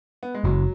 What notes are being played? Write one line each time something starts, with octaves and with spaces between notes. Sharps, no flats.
B3
G#3
F#1 F#3